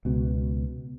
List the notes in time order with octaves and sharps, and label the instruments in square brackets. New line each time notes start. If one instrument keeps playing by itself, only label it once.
[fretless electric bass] C#2 B2